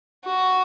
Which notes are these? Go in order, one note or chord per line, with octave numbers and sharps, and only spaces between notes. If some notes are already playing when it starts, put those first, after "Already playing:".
F#4